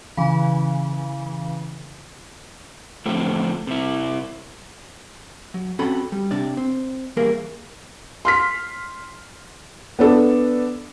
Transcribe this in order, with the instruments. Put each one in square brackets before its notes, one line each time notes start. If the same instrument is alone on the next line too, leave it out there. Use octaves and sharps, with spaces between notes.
[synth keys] C#3 E3
[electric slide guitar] A2 D3 F3 A3 C4
C3 E4
[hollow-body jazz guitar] F#3
C4 C#4 F#4 A4 F#5 B5
G3
C3 D4 D5
C4
E3 G3 A#3 G#4 A#4
[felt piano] C6 F6 B6
B3 D4 A4